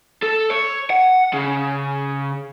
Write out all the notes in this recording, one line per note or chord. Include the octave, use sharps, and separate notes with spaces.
A4
C#5
F#5
C#3